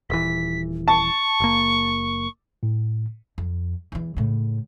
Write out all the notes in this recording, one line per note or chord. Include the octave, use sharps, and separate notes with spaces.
D#1 E3 B6
A5 C#6
F#1 A#3
A2
F2
E2 E3
A2 C#3